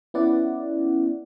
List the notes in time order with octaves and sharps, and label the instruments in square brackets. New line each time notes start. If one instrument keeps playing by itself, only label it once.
[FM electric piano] B3 C#4 E4 D5 F#5